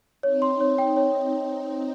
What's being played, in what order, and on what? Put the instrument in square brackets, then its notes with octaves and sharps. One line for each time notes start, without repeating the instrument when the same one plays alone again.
[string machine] C4 D#4 [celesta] C#5
[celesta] C6
C#5
[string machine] C4 D#4 [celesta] G5
[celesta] C#5